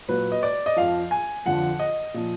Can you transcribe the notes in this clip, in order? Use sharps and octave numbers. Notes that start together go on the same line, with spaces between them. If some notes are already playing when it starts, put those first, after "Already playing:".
A#2 F#3 B4
D#5
D5
D#5
F2 F3 F5
G#5
F2 D3 F3 F#5
D#5
A#2 F3